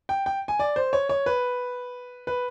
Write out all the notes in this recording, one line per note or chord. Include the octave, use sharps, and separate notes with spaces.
G5
G5
G#5
D5
C5
C#5
C#5
B4
B4